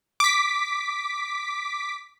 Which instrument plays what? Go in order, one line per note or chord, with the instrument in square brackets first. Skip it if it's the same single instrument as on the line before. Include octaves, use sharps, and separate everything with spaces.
[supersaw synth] D6 B6